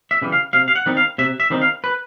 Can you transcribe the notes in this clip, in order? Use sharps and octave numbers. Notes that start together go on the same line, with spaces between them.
E5
C#3 E3 G3
F5
C3 F5
F5
F#5
D#3 G3 C4 D#4
F5
C3 E5
E5
D#3 G3 C4 D#4
F5
B4